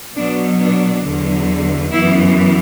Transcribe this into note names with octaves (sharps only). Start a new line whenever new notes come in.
B2 F#3 B3 D4
D4
E2 D3 F#3
F#2 E3 B3 E4